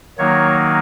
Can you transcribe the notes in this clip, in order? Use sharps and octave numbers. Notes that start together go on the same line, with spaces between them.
D#3 F#3 A#3 D#4 C#5